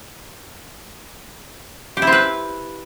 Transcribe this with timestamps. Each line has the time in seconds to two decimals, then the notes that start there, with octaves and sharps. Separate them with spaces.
1.97 G4
2.02 E4
2.07 C4
2.12 B4